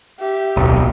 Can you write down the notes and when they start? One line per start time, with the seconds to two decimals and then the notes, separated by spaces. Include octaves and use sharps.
0.20 G4 E5
0.57 D1 B1